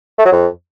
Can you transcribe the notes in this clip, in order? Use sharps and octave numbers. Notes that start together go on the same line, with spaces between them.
A3
F#3
F2